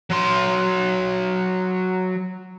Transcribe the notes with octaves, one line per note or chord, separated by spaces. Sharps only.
F#3 C6